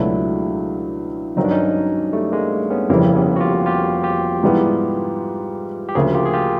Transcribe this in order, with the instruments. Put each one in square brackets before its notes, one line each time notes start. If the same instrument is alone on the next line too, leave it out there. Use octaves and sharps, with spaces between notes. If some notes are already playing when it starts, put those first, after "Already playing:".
Already playing: [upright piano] C#2 B2 F#3 A3 [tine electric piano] D4 E4
[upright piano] G#1 G2 D#3 F#3 [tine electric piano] D#4
[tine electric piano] D4
C#4 D#4
G3 A3
G#3 A#3
B3 C#4
[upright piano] F1 F2 C#3 E3 G3 [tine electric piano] A#3 C4
[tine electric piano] B3 C#4
F#4
F4 G4
F4 G4
F4 G4
[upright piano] G#2 E3 G3 B3
[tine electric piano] G4
[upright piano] D2 C#3 F3 A#3 [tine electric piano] F#4 G#4
[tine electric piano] F4 G4
G#4
F4 G4